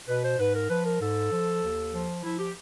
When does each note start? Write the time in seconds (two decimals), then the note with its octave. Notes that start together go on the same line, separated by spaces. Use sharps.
0.08 B2 B4
0.23 C5
0.39 G#2 B4
0.54 A#4
0.70 F3 B4
0.85 A#4
1.00 G#2 A4
1.31 F3
1.61 D#2
1.93 F3
2.23 F3 E4
2.38 G4